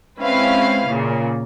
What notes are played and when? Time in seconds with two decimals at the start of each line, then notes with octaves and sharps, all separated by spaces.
0.18 G#3 C4 C#4 E4 B4 F5
0.88 A#2 C#3